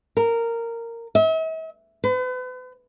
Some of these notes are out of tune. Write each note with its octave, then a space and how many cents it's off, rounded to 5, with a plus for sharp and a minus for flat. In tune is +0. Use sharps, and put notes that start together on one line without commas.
A#4 -10
E5 -45
B4 +40